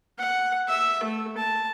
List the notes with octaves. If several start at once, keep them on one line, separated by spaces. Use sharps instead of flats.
F#5
E5
A3
A5